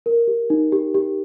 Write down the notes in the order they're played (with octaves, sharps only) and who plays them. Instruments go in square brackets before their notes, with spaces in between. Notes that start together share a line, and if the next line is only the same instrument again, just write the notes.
[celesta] A#4
G4
D#4
G4
G4